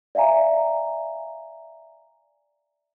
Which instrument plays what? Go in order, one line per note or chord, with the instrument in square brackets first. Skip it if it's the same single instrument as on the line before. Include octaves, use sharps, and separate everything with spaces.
[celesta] D5 E5 F5 G#5 A#5